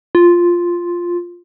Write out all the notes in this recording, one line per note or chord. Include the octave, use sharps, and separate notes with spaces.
F4